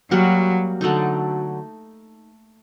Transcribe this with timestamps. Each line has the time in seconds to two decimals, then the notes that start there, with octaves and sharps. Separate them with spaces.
0.11 F#3 G3 A#3 F#4
0.81 D3 F#3 A3 D#4